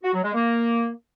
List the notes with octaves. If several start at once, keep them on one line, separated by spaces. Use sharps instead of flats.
F#4
F#3
G#3
A#3